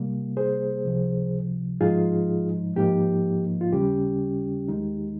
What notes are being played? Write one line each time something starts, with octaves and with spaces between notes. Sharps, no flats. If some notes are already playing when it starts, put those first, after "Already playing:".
Already playing: C3 G3 A#3
G#4 C5
C#2 C3 F3
G#2 F3 G#3 D#4 F4 G#4
G#2 F3 A#3 D#4 G4
F4
D#2 C#3 G3 C#4 G4
D#2 D#3 G#3 D#4